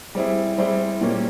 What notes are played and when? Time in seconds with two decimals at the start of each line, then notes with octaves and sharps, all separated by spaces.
0.15 G3 C4 E4 G#4 C5
0.58 G3 C4 E4 G#4 C5
1.01 A#2 G3 A#3 C#4